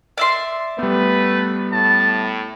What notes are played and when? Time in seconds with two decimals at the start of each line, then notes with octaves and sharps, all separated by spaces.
0.18 D5 E5 C6
0.79 G3 A3 B3 B4
1.72 A2 A5